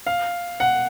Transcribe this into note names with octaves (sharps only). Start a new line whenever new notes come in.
F5
F#5